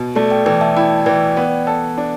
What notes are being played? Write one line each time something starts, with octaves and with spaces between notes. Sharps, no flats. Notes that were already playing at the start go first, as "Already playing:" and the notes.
Already playing: B2
A3 A4 D5
D5 G5
E3 D5 G5
E5 A5
E4 D5 G5
E3 D5 G5
B3 D5 G5
A4
D4